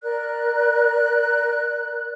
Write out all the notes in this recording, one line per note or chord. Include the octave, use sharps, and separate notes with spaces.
A#4 D5 F#6